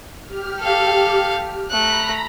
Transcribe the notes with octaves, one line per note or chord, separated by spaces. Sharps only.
G4 F6
A4 F5
A3 A#5 B5 F#6